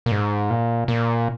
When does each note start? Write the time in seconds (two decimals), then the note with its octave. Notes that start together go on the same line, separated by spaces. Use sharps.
0.06 A#2
0.12 G#2
0.50 A#2
0.88 A#2